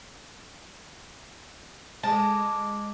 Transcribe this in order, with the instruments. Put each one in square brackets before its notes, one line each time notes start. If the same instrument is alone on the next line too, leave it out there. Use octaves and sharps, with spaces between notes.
[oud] G#3 [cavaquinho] D5 A5